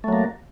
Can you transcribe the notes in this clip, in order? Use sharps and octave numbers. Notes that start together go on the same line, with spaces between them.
F#3 A3 A#3